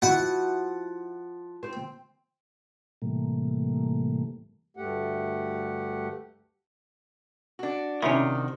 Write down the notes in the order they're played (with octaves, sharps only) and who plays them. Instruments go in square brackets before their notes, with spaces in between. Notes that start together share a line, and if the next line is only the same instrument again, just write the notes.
[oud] F3 E4 F#4 [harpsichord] F#5
[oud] C4 C5
[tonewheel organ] A2 C3 E3 G3 A3 A#3
[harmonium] D2 G2 A3 G4 F#5
[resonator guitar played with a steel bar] D4 F#4
[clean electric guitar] C3 D#3 [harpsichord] C#4 E4